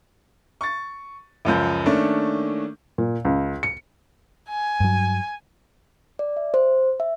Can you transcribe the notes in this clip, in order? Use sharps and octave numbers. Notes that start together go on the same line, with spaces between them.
C#6 A6
C#2 F#2 F3 G6
D#3 A3 A#3 C#4 D4
A#2
C#2
C#7
G#5
G2 F#3
D5
E5
C5
E5